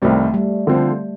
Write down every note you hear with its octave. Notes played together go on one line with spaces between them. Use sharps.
C2 C3 D#3 G3 A3 C4
G3
D3 F3 C4